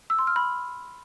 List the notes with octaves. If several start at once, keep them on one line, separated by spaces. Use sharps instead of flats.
E6
C6
F6
B5